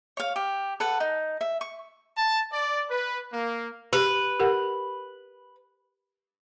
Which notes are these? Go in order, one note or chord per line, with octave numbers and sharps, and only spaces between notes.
C#5 F5
G4
A4 B4 F#5
D#4
E5
C#6
A5
D5
B4
A#3
G4 B4
G4 A#4 F#5